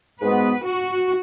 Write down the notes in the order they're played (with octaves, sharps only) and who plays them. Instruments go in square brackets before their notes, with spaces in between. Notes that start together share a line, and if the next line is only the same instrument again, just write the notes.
[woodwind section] G#2 G#3 B3 F#4 [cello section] B4
[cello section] F#4